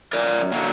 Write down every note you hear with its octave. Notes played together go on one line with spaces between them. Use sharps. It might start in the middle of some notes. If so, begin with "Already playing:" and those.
F#2 A#4 D5
D3 F#3 A#3